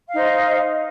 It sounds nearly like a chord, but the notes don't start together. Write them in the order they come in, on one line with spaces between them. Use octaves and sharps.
F5 D#4 C5 D#5